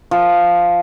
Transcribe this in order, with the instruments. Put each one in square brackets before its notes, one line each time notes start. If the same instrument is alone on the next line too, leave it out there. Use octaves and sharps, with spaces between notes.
[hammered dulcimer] F3